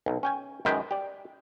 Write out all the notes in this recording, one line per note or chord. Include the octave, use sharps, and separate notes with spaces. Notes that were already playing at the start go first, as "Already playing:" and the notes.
B1
C#4 G5 G#5
F#2 D#3 G#3 B4 G5
G4 D5